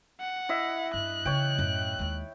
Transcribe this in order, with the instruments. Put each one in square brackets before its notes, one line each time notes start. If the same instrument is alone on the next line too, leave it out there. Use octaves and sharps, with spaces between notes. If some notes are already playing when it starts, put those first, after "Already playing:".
[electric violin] F#5
[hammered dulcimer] E4 D#5 E5
[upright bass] G2 [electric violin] F#6
[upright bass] C#3 E3 [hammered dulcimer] C#5 G5
[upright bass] F#2 A2
D#2 G#3